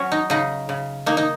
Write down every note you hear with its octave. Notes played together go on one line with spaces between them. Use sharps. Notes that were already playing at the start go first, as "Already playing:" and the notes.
Already playing: F#3 C#4
D#4
C#3 D#4
C#3
A#3 D#4
D#4